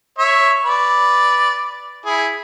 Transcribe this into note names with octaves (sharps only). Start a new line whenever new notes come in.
C#5 E5
B4 D5
E4 G#4